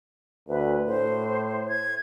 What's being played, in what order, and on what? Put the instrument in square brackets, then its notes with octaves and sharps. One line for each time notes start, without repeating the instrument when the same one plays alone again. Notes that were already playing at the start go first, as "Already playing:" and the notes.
[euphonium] D2 [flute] B4
[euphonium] A2 [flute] C5
[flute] G#6